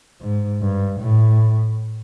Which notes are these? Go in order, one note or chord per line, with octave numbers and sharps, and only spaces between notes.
G#2
G2
A2